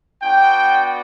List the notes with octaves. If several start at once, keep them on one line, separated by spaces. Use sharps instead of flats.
B3 D4 F#4 G5